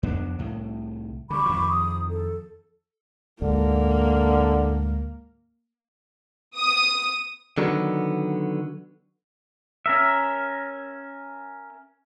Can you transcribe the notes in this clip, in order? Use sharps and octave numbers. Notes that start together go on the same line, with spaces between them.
F2 B3 D4
C2 A2
D3 G3 B5 C#6 D6
F2 D#3 F3
D#6
A4
D2 G#2 D3 A#3
D#6
D3 D#3 F#3 B3
C#4 A#4 E5